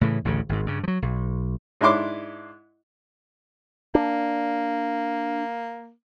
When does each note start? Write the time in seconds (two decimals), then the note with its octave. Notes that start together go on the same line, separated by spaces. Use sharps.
0.01 A2 C#3 E3
0.25 A1 D2 A2 C#3
0.49 G#1 G#2
0.66 G2 C#3
0.83 F3 F#3
1.02 B1
1.81 G#2 D4 E4 C6 D6
3.95 A#3 D4